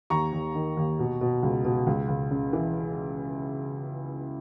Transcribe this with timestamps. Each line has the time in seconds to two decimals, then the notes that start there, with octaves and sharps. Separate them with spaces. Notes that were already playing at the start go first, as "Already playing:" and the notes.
0.10 D#2 A#5 C#6
0.33 D#2
0.55 D#3
0.77 D#2
0.99 B2
1.21 B2
1.43 C#2
1.65 B2
1.87 C#2
2.08 C#2
2.31 C#3
2.53 E3